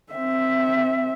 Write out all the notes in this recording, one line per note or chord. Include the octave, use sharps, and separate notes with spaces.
C4 E5